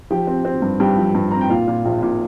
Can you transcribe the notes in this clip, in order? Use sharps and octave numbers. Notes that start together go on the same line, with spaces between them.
F3 G4 G5
C4
C4
G2
G2 G4 G5
F3
G2
C4 A#5
G5
A#2 F4 F5
A#2
A#1
A#2